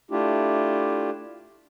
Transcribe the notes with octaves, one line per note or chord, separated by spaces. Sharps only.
A3 D4 E4 F4 G4